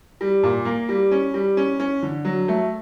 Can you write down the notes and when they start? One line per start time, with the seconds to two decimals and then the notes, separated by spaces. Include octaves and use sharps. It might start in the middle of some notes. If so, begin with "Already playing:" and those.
0.21 G3
0.43 A#2
0.65 A#3
0.89 G3
1.11 C#4
1.34 G3
1.57 C#4
1.80 C#4
2.03 D3
2.25 F#3
2.48 A3